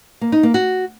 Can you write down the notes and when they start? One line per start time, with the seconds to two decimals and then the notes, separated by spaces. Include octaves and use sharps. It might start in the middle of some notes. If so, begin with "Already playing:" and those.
0.21 A#3
0.32 D#4
0.43 A#3
0.54 F#4